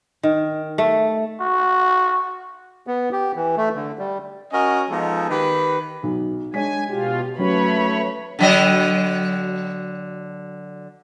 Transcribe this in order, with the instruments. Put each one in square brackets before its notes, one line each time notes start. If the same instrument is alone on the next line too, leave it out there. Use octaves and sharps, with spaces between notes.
[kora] D#3
A3
[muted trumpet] F#4
[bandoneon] B3
G4
E3
A3
D3
G3
[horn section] C#4 F#4 A#4 C#5 D#5
F3 G#3 B3 D#4 A4
D#3 G4 B4
[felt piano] B1
[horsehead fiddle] G#3 D4 [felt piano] C#5 B6 [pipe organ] G#5
[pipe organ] B2 F4 [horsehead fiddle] G4
[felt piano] F#3 C#4 [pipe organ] A3 C#5 [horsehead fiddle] B4 B5
[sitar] D3 F#3 D#5